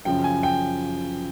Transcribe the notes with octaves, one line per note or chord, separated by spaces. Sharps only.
F#2 C#3 F3 G5
G#5
G5